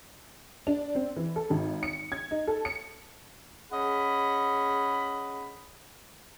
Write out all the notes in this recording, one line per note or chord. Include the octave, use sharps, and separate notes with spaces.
D4
C4
E3
A4
G#1
C#7
G#6
D#4
A4
C#7
C#4 G#4 D#5 F#5 B5